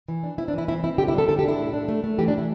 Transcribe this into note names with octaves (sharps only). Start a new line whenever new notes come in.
E3
D4
C4 E4
D4
E3 E4
C4 E4
C4 E4
D3 G4
E4
G3 A4
D3 A4
G4
D4 E4
A2
D4
A3
A3
E3 G4
D4
E3 E4